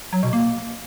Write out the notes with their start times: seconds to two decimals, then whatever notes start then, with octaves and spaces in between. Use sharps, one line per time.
0.13 F#3
0.23 B2
0.33 A#3